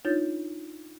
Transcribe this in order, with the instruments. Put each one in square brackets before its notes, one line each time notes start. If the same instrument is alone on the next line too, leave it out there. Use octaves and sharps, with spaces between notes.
[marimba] D4 D#4 F4 C#5 G6 A6